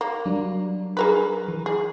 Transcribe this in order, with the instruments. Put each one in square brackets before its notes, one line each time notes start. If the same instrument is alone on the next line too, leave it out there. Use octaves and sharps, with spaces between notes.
[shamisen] A#3 [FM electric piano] A#5
[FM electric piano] F#3 G3 D4
[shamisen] G#4 A#4 B4
[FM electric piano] E3
[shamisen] G#4